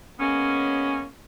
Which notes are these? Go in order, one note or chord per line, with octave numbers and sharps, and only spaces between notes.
G#3 A#3 B3 C#4